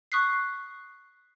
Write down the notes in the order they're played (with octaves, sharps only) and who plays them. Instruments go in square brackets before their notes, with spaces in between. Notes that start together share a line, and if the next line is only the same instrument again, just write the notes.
[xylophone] C#6 D#6 F#6 B6 C7